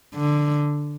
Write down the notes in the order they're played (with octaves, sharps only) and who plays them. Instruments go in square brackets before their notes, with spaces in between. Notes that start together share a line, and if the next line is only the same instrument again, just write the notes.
[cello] D3